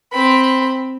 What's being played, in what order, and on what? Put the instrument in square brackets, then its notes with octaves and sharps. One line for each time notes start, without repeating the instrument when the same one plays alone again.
[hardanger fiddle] C4 B5